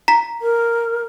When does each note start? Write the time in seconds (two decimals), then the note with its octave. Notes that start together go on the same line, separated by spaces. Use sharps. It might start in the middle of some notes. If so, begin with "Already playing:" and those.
0.08 A#5 B6
0.42 A#4